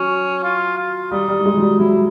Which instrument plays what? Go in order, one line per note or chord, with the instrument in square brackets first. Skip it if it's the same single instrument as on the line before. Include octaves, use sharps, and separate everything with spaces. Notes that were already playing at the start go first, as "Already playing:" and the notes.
Already playing: [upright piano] F#3 [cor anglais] C#4
[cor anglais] F4
F4
[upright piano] G3 [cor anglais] D#4
[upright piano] G3
G3
G#3
F#3
G3
[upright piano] F#3 [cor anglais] E4